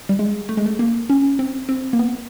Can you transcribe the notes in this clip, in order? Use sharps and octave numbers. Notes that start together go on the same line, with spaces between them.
G3
G#3
A3
G#3
A3
A#3
C#4
C4
C4
A#3
B3